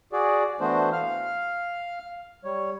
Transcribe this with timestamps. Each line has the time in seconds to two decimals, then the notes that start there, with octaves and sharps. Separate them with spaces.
0.13 F#4 G#4 D5
0.61 E3 A3 B3 D4 F#4 C5
0.93 F5 F6
2.44 G3 C#5